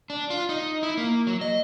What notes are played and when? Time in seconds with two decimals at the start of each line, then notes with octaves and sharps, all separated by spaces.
0.10 D4
0.30 F4
0.49 D#4
0.83 E4
0.97 A#3
1.27 F#3
1.41 D#5